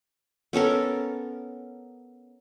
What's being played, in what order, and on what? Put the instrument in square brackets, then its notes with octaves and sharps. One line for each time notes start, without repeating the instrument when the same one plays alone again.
[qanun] B3 C#4 A4 A#4